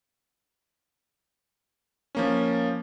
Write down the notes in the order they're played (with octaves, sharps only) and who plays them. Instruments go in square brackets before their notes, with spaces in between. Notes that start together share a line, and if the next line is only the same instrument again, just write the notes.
[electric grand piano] F3 A#3 C#4